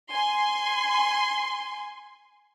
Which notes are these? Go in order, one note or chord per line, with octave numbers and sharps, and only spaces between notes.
G#5 C6